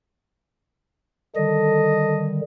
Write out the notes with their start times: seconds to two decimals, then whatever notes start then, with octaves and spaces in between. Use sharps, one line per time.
1.36 D3 D#3 G3 A4 D#5